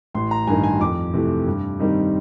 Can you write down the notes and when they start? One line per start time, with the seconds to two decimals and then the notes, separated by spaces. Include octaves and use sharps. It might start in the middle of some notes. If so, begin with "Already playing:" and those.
0.14 A1 C6
0.31 A#5
0.47 G2 D#3 G#5
0.63 G#5
0.80 F2 D6
1.13 C3 E3 A3
1.47 G2
1.79 D#3 G3 C4 D#4